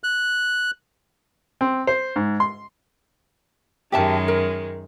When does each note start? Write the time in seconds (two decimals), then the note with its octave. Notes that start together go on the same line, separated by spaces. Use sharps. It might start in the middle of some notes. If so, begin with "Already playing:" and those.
0.04 F#6
1.61 C4
1.87 C5
2.16 G#2
2.40 C6
3.92 F#2 D#3 G#3 G4 E5 A5
4.28 A#4